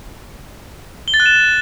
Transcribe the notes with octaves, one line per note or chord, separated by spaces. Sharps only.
G7
A6
F#6
E7